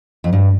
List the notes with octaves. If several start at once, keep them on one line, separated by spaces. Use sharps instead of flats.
F2
G2